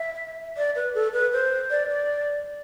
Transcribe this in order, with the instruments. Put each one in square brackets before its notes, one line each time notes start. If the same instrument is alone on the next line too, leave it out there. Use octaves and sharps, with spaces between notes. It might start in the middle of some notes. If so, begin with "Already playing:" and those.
Already playing: [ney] E5
D5
B4
A4
B4
C5
D5
D5